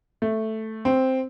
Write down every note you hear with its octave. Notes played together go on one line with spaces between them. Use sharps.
A3
C4